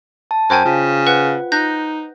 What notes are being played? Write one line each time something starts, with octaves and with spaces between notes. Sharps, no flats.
A5
F#2 C5 G5 G#5
C#3 F4
B4 F#5 F#6
D#4 F#6 G6 A#6